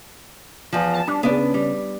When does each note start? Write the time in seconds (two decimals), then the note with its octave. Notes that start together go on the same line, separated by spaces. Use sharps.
0.73 E2 F3
0.93 A5
1.08 G3 D4
1.23 C#3 B3 D4
1.54 G3